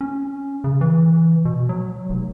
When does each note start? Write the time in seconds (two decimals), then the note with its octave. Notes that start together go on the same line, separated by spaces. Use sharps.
0.01 C#4
0.64 C#3
0.81 E3
1.45 B2
1.69 F#3
2.09 F1